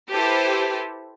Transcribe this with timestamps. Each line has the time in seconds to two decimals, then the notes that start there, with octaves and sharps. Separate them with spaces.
0.13 E4 G4 A4 B4 C5